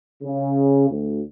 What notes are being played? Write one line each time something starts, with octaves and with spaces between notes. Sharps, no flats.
C#3
D2